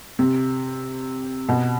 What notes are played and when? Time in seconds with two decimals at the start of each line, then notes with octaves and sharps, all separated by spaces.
0.19 C3
1.49 B2